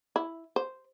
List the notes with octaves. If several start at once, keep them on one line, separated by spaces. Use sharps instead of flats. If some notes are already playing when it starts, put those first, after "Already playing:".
E4
C5